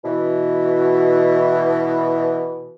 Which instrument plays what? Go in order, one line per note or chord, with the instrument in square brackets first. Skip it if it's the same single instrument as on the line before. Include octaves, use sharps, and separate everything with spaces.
[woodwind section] B2 E3